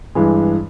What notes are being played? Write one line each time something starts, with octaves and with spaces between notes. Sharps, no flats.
G2 E3 G#3